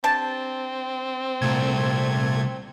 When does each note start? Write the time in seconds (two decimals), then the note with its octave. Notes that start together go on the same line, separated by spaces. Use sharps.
0.04 C4 D4 G4 A5
1.42 C2 A#2 A3 G#6